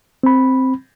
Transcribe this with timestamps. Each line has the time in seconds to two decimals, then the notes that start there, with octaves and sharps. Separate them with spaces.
0.23 C4 B5